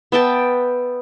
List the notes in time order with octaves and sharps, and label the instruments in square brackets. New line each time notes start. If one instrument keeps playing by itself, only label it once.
[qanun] B3 E5 G5 A5